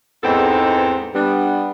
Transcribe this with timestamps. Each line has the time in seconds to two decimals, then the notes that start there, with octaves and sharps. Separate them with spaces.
0.24 E2 G#2 B3 C4 D#4 A4
1.15 G3 B3 D4